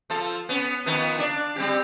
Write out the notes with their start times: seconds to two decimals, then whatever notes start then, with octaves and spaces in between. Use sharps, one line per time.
0.10 F3 F4 A4
0.49 B3 C#4
0.86 D#3 F3 B3
1.18 D4 D5
1.56 G3 C4 G4